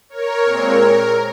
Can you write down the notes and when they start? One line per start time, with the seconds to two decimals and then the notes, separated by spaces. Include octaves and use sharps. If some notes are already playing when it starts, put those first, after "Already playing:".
0.09 A#4 C#5
0.45 A#2 G#3 C4
0.80 A#4